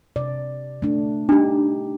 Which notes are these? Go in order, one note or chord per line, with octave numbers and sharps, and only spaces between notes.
C3 D5
A3 D4
D4 D#4 G4